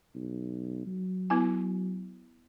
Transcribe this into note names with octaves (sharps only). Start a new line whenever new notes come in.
B1
F#3
B3 E4 G#5